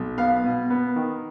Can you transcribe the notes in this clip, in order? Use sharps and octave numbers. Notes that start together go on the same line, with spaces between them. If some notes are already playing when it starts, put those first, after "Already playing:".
Already playing: B1
B3 F5
B2
B3
D#3